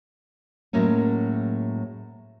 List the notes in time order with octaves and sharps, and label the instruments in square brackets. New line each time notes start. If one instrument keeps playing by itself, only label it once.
[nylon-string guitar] A2 F#3 G#3 A#3 C#4